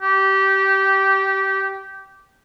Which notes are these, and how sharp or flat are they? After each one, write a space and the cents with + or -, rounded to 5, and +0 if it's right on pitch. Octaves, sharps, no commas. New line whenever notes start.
G4 -20